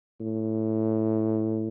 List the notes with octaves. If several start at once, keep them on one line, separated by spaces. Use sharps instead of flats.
A2